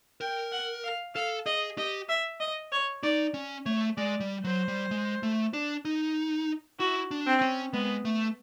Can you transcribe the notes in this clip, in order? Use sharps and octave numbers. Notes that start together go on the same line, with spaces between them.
A#4 G5
F#5
F5
A4 F5
G#4 D#5
G4 D#5
E5
D#5
C#5
D#4 D5
C#4
A3 C#5
G#3 D5
G3
F#3 C5
G3
G#3
A3
D4
D#4
E4 F#4
D4
C4
C#4
G#3 B3
A3